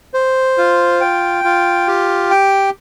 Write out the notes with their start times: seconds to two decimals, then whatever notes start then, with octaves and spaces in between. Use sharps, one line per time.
0.14 C5
0.58 F4
1.01 G5
1.44 F4
1.87 G4
2.31 G5